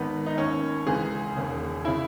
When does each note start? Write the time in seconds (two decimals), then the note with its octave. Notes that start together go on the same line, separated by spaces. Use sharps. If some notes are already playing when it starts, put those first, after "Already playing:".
Already playing: G#1 G#2 D#3 B3
0.26 D#4
0.38 D#2 D#3 C#4
0.87 C#2 C#3 E3 G#4
1.36 E1 D#2 C#3
1.85 C#3 E4